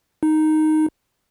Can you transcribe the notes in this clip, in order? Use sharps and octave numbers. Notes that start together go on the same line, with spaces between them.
D#4